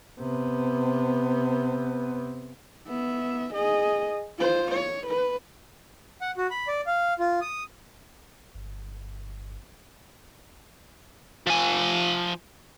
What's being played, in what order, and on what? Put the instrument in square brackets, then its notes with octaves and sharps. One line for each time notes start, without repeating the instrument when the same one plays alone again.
[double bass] C3 B3
[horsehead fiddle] B3 E5
G#4 D#5
F4 C5
C#5
B4
[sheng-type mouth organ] F#5
F#4
B5
D5
F5
F4
D#6
[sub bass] G1
[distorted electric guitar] F3 G#5